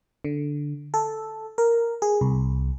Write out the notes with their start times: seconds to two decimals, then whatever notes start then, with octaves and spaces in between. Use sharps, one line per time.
0.24 D3
0.94 A4
1.58 A#4
2.02 G#4
2.21 C2